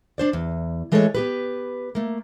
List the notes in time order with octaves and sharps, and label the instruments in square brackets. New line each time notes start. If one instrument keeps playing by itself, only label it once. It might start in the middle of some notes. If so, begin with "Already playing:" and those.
[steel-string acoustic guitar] D4 C5 D5
E2
E3 G#3 A3 A4 B4 C#5
B3 G4 B4
A3 A#3